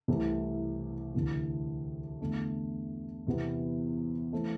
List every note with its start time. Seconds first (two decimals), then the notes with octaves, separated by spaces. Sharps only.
0.08 C2 C3 E3 A3
1.14 D2 C3 E3
2.21 E2 D3 A3
3.27 E2 C3 E3 B3
4.32 E3 A3 C4